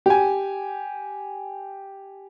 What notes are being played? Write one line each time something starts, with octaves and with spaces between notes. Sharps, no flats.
G4 G#5